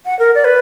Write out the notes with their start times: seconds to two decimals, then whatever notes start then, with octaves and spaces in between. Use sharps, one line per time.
0.06 F#5
0.19 A#4
0.35 D5
0.45 B4